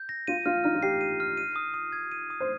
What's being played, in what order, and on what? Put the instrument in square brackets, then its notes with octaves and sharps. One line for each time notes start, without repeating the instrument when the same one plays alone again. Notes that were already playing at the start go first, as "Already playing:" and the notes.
Already playing: [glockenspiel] G6
A#6
[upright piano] F4 [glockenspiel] D#7
[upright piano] F4 [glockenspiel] F6
[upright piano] D#4 [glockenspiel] F6
[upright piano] F4
[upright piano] G4 [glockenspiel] C7
[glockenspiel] D#7
F6
D#7
D#6
D#6
G#6
D#7
D#6
[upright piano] C5